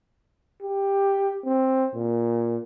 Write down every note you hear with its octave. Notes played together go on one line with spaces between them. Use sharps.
G4
C4
A#2